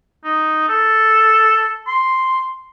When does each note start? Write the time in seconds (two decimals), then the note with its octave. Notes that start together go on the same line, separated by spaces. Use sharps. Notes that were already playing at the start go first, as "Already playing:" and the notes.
0.25 D#4
0.69 A4
1.87 C6